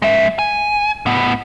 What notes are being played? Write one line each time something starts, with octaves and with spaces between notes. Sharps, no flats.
G#3 E5
G#5
A2 B3